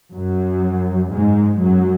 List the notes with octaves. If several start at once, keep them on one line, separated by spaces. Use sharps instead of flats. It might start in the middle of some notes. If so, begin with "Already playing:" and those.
F#2 F#3
G#2 G#3
F#2 F#3